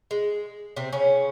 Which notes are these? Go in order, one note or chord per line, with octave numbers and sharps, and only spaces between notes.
G#3
C3 C4
C#3 C#4